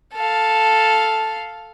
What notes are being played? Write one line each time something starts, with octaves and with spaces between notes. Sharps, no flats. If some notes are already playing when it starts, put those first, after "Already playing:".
A4 F5